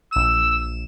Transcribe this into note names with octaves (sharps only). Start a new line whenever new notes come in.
A#1 E6 E7